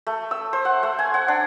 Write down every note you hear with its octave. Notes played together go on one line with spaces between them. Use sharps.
A3
E6
C5
F#5
A3
G#5
F#5
D4